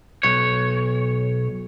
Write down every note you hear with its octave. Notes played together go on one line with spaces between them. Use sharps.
B1 C#5